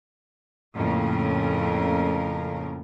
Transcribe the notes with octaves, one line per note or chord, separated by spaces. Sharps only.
F2 A2 C#3 A#3 A#4